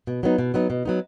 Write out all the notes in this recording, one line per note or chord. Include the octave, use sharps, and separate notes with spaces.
B2
F#3 B3 D#4
B2
F#3 B3 D#4
B2
F#3 B3 D#4